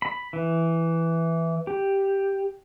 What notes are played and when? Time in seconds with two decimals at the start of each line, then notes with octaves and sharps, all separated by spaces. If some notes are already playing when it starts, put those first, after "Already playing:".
0.02 B5
0.33 E3
1.67 G4